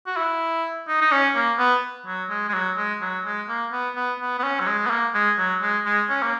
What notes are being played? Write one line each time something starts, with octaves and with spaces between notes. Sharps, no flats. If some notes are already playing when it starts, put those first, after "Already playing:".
F#4
E4
D#4
D#4
C#4
A#3
B3
F#3
G#3
G#3
F#3
G#3
F#3
G#3
A#3
B3
B3
B3
B3
C#4
F#3
G#3
B3
A#3
G#3
F#3
G#3
G#3
C#4
A#3